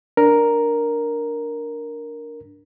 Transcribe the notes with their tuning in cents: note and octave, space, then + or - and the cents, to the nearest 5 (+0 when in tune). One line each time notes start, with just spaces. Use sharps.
D4 +0 A#4 +0